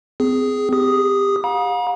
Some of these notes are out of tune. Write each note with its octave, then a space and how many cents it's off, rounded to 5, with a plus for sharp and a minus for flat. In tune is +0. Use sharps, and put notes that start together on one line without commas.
C4 -35 G#4 +0
G4 +25 D#6 +0
F5 +45 A#5 +45